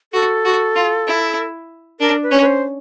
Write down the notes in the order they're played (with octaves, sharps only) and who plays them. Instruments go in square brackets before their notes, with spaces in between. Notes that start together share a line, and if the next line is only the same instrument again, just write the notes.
[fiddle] F#4 [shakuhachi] A4
[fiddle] F#4
F4
E4
[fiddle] D4 [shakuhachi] A#4
[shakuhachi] B4
[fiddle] C#4
[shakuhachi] B4
C5